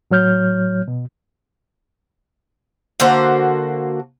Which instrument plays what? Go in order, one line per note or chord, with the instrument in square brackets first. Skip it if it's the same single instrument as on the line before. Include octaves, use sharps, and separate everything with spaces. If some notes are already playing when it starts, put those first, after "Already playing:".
[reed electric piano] A2 F#3 C#5 F6 G6
B2
[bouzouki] D3 A#3 F#4 C5